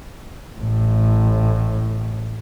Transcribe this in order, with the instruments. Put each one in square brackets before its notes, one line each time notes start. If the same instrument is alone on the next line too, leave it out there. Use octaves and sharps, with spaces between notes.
[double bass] A1 A2